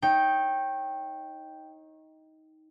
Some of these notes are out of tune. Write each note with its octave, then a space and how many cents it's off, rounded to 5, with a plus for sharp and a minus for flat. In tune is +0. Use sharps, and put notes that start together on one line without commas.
D#4 +15 C#5 -25 G5 +0